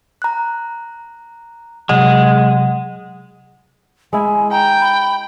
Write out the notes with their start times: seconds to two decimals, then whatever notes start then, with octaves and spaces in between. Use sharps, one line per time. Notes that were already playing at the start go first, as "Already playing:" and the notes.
0.22 A#5 F#6
1.89 C3 F#3 G#3 F#5
4.13 G#3 E4 G#5
4.52 G5 A#5
4.80 B5